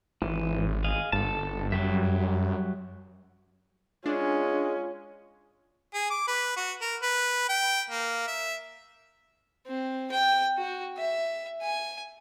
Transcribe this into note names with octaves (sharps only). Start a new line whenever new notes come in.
G#1 E3
G#4 D#5 F5
G1 A4 A5
F#2 F#3 G3 E5
G#3 C#4 D4 F4
G#4
D6
B4
F#4
A#4
B4
G5
A#3
E5
C4
G5
F#4
E5
G#5